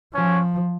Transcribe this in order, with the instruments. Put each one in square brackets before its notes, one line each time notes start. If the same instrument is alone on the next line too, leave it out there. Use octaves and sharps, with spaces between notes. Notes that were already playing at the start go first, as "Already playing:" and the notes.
[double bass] F3 [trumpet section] C#4